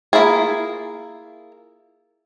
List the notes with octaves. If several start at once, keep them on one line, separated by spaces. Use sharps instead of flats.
A#3 E4 F4 G#4